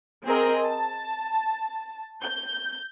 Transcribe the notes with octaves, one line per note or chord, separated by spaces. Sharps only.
C4 G#4 A#4 D#5
A5
G6